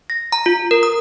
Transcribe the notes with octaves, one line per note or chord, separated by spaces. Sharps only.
A#6
A#5
F4
A#4
D#6